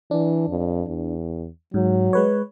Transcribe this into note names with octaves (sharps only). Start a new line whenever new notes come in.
E3 D4
F2
E2
G#2 F#3
G#3 B4 C#5